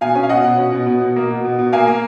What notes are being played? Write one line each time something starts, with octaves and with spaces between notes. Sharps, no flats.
B2 F5 G#5
C#4
F5
B2 D#5 F#5
B2
C#4
B2
B2
B2
A#3
B2
B2
B2
A#3 F5 G#5
A#3